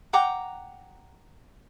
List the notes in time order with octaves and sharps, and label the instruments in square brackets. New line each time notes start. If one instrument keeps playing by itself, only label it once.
[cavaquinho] F#5 G5 A#5 D6